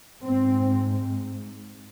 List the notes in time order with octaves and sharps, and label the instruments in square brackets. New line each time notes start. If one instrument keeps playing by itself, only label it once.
[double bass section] G#2 C4